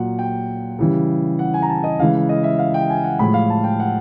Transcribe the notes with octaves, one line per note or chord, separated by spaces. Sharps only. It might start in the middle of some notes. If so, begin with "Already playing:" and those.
Already playing: A#2 F#3 F#5
G5
C#3 E3 G3
F#5
G#5
A#5
A5
D#5
C#3 E3 G#3 F5
D#5
E5
F5
G5
G#5
F#5
A2 F3 G#3 B5
F5
A5
G5
F#5